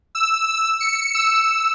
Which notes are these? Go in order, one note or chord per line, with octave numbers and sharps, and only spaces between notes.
E6
C#7
E6